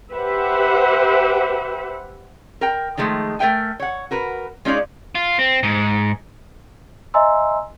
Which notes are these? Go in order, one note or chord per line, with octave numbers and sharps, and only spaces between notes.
G4 B4 C5 E5 F#5
A#4 G5
D#3 F3 G#3 A3
A3 A#4 E5 G5 G#5
C#5 F#5
F#4 A#4 B4
G#3 C#4 D#4 F4 G#4 D5
F4
C4
G#2
D#5 E5 G#5 A#5 C6 E6